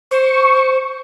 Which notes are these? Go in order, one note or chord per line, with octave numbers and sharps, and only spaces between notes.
C5 C#6